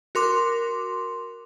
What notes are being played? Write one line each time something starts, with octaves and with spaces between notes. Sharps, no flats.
F#4 A#4 C6 D6